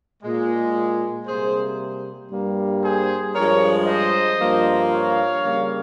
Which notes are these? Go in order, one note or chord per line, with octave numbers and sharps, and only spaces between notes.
A#2 G#3
C3 G3 A#3 G#4 C5
G2 G3 A#3
G#4 C5
G2 F3 G#3 A#4 C#5
C5 D#5
G2 F3 A#3
C#5 F5
C#3 G3 A#3